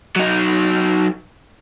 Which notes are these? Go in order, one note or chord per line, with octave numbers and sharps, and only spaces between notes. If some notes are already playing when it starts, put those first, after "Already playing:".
F#3 D#4